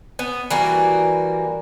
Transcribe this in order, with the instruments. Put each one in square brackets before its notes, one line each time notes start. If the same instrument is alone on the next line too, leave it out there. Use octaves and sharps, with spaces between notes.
[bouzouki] B3
E3 G3 A#3 F#4